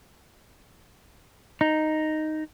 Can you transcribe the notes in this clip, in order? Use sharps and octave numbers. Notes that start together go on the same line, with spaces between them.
D#4